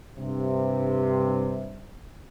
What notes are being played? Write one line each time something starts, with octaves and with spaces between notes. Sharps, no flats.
G2 C3